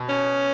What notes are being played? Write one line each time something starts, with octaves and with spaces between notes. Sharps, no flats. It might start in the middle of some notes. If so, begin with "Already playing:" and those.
Already playing: B2
C#4